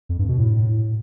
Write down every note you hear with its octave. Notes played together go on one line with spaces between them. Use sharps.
F2
G2
B2
A2